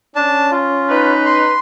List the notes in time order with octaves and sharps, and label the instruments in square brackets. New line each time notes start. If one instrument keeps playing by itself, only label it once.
[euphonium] C#4 [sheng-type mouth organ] D4 A5
[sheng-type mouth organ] F4
[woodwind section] D#4 B4
[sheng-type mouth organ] C6